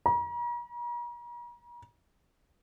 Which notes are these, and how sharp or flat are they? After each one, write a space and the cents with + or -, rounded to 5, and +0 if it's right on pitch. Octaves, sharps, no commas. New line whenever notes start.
A#5 +45